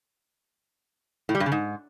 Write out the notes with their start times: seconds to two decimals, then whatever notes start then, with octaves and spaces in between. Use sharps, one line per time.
1.29 A2
1.35 G3
1.40 G2
1.46 C#3
1.52 G#2